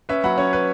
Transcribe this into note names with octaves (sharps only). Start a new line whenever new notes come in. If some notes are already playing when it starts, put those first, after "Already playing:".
C#4 B4 E5
F#3 F#5 B5
C#4 C#5
B4